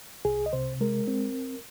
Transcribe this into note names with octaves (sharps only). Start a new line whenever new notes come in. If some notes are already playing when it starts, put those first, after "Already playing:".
C2 G#4
D#5
C3 C5
G#3 A#4
C4